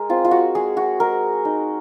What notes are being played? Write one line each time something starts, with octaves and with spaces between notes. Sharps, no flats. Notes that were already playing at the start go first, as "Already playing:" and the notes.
Already playing: G#3 G#4 A#4
C4 F4
F4
F#4
G#3 G#4
F#4
G#3 A#4
D#4